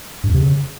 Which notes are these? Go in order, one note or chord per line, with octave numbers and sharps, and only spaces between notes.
G2
F2
C3
C#3